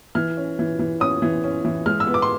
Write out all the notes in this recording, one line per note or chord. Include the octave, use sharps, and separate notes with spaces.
E3 F6
C#4
E3
E3
C#4 D#6
E3
C#4
E3
G#3 F6
E6
B3
D6
C6